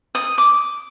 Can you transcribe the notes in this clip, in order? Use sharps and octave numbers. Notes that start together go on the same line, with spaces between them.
D#6
D6